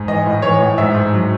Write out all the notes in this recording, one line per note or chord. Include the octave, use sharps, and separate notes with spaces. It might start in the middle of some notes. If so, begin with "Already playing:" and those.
Already playing: G#2
E3 D#5
A2
E3 C#5
A2
G#2 E5
G#2
F#3